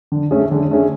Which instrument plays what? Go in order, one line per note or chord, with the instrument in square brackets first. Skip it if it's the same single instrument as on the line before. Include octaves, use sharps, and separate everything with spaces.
[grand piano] D3
A3 C#4 G#4
D3
A3 C#4 G#4